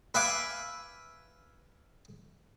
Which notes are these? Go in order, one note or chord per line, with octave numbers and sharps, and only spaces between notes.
B4 E5 F5 G#5 D6